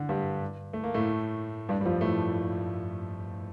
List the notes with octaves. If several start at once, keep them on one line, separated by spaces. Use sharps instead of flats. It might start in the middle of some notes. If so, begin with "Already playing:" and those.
Already playing: D3
G2 G3
A3
A#3
A2 A3
G2 G3
G3
F2 F3
A2 A3